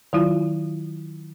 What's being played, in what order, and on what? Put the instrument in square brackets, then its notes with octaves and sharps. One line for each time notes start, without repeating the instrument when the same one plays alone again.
[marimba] D#3 F#3 E4 F4